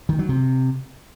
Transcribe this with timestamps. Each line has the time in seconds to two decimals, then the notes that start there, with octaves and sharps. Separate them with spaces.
0.09 D#3
0.19 F#3
0.29 C3